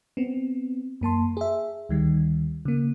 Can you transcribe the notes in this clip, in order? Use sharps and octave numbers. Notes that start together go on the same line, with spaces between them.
B3 C4
F#2 A#3 A5 C6
G#4 E5
D2 D#3 G3
C#3 A#3